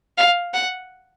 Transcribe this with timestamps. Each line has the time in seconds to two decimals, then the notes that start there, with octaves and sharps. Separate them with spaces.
0.17 F5
0.53 F#5